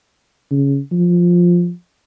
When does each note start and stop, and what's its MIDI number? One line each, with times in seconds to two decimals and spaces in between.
0.51 0.78 49
0.92 1.71 53